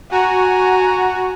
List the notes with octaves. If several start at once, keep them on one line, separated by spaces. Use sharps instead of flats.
F#4 G#5 A#5